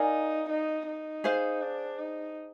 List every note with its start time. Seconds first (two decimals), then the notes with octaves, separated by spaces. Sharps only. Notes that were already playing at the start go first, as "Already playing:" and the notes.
Already playing: D#4 A#4 D5 F5 G#5
0.49 D#4
0.87 D#4
1.24 G#4 C5 F5
1.62 D4
1.99 D#4